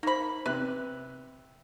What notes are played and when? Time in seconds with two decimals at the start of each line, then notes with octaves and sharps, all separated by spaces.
0.03 A#3 D#4 C5 B5
0.46 C3 B4 F#6